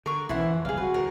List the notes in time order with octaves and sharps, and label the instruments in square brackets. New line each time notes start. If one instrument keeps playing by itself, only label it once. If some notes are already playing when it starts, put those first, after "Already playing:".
[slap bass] D3 [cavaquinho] A#4 C#6
[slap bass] B1 C#4 [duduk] E3 [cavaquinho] E4 C5 F#5
[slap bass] F2
[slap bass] F#1 C2 [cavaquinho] G#4 F5
[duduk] F#4 [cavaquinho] B4
[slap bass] D2 A2 [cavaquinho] A#4